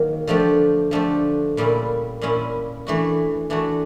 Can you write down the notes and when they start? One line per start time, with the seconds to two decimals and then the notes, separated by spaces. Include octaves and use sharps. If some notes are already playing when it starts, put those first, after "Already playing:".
Already playing: D#3 F#3 A#3
0.27 D3 F3 A3 D4 G4
0.91 D3 F3 A3 D4 G4
1.57 A#2 G3 A#3 C#4 E4
2.21 A#2 G3 A#3 C#4 E4
2.87 E3 A3 D4 F#4
3.50 E3 A3 D4 F#4